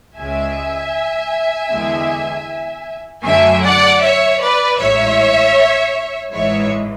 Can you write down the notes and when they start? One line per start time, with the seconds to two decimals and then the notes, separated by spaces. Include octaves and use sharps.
0.17 C#2 C#3 G#3 E5 G#5
1.70 E2 D3 G#3
3.24 F#2 D3 F#3 A3 E5 G#5
3.63 D5 F#5
4.02 C#5 E5
4.40 B4 D5
4.79 A1 G#2 G#3 C#5 E5
6.33 A1 G#2 E3 G#3 C#5 E5